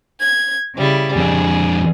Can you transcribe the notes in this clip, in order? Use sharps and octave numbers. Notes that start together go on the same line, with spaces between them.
G#6
C#3 G3 E4
F2 D4 G#4